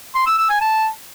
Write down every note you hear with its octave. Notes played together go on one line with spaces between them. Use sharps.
C6
E6
E6
G#5
A5